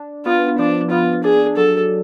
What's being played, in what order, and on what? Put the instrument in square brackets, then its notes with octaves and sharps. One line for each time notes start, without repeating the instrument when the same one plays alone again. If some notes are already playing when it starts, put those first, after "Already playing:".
Already playing: [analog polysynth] D4
[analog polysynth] B3 [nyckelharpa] F4
[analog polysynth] F3 [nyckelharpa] D4
[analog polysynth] B3 [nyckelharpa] F4
[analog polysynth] D4 [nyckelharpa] G#4
[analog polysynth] F#3 [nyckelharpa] A4